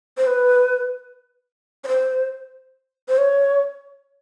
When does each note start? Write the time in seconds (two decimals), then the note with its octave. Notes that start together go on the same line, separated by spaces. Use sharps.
0.17 C5
0.27 B4
1.84 C#5
1.88 C5
3.09 C5
3.18 C#5